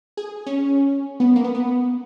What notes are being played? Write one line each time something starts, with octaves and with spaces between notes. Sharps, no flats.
G#4
C#4
B3
A#3
B3
B3